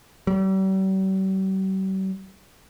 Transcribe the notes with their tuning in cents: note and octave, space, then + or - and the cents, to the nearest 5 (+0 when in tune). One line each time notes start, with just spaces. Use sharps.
G3 -45